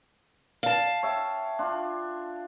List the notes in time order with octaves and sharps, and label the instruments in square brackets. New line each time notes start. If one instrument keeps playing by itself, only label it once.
[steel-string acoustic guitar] F5 A5
[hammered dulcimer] C#5 E5 G5
D4 F4